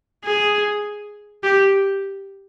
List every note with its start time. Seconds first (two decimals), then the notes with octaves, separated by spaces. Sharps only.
0.25 G#4
1.44 G4